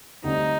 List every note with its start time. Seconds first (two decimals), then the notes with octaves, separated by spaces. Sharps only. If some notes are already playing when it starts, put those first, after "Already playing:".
0.23 D2 D3 G3 C4 D#4